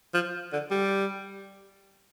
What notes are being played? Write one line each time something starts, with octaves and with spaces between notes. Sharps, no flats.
F3
D3
G3